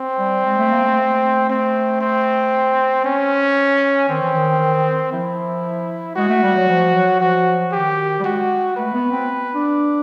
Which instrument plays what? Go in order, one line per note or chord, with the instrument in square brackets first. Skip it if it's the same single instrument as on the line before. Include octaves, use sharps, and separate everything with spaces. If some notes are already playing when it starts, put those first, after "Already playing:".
Already playing: [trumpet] C4
[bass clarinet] G3
G#3
A3
A#3
A3
A3
[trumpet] C4
C4
C#4
[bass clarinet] D#3 [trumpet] C4
[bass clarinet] E3
D#3
[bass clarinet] F3 [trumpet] E4
[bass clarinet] G#3 [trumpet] F#4
[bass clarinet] A3
G3
F#3
F3
F#3
[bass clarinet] F3 [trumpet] F#4
[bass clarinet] D#3 [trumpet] G4
[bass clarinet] G3
[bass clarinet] G#3 [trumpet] F#4
[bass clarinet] A3 [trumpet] B4
[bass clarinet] B3
C4
D4